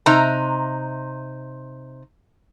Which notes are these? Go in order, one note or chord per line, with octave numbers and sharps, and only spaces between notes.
C3 D#4 A#5